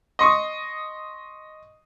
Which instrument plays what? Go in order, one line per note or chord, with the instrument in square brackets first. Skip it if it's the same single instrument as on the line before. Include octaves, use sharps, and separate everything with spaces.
[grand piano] D#5 C6 C#6 D#6